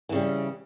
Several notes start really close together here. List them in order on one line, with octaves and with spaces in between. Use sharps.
E3 C#3 G3